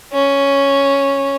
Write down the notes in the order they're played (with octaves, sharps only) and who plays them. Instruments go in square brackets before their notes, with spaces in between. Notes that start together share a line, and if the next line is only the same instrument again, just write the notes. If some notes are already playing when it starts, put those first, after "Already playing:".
[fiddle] C#4